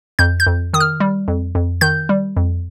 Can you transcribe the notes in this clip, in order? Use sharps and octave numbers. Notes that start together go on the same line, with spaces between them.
F2 G6
G6
F2
D#3 D#6
F6
G3
F2
F2
D#3 G6
G3
F2